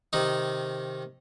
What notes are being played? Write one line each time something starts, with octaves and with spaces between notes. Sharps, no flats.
C3 D#3 D#4